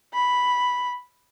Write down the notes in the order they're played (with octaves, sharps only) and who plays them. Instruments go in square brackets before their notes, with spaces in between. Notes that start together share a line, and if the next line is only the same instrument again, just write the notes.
[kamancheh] B5